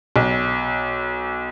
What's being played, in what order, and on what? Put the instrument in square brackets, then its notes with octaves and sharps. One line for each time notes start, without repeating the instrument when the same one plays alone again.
[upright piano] B1